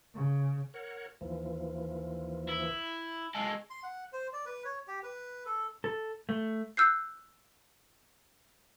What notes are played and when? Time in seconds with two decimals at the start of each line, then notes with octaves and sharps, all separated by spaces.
0.15 C#3
0.74 A#4 C#5 F#5
1.21 D#2 E3 F3
2.49 E4
3.35 G#3 A4 F5
3.70 C6
3.83 F#5
4.13 C5
4.33 D5
4.46 B4
4.65 C#5
4.88 G4
5.03 B4
5.46 A4
5.84 A4
6.29 A3
6.77 E6 F#6 G6 C7